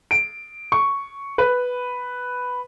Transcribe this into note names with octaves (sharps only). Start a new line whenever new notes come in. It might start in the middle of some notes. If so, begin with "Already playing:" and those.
D7
C#6
B4